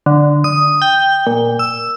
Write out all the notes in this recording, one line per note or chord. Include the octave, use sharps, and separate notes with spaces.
D3
D#6
G5
A#2
E6